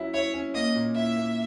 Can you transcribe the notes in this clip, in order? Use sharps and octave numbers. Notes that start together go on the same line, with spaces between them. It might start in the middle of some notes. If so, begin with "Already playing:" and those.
Already playing: F#3 C#4 E4
E4 C#5
C#4
A#3 D#5
A#2
E4 E5
A#3